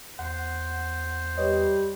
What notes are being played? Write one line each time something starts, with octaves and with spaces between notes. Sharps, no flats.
E2 C5 F#5
G3 B4 C#5 D#5